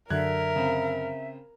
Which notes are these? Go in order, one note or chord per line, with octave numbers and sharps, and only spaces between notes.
F#2 D3 A#4 E5 F#6 G#6
C#3 C4